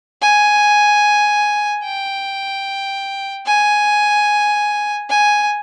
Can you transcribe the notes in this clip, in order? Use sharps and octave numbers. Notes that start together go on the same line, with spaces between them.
G#5
G5
G#5
G#5